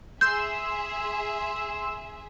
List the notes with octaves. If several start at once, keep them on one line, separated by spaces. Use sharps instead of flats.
G#4 E5 C6 E6 G6 E7